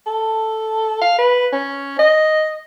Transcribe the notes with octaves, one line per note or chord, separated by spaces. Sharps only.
A4
F5
B4
C#4
D#5